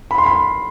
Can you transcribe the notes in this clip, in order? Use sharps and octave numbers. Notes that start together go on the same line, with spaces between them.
B5
C6
B5